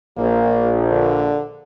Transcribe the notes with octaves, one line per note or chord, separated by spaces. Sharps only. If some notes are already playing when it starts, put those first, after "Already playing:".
A#1 A#3
D3